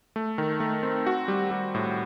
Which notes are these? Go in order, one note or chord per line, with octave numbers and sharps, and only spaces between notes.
A3
D#3
A3
C4
F#4
G3
G3
A2